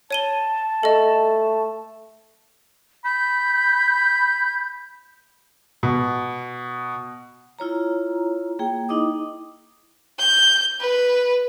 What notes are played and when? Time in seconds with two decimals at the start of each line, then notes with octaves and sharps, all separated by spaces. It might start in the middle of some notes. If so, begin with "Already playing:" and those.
0.11 C#5 A5 D#7 G7
0.83 A3 A4 D#5
3.05 B5 G6
5.83 B2
7.59 E4 F4 C#5 A#5
8.59 A#3 G#4 G5
8.89 D#4 E4 D#5 D6 D#6
10.19 G6
10.80 B4